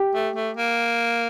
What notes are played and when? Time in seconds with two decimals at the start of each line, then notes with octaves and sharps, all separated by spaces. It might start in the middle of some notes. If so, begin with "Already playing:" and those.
Already playing: G4
0.14 A3
0.36 A3
0.57 A#3